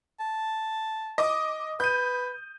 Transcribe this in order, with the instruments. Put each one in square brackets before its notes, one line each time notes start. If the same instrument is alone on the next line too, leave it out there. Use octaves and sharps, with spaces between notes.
[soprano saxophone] A5
[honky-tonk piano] D#5 D6 D#6
[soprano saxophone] B4 [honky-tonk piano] G6 D#7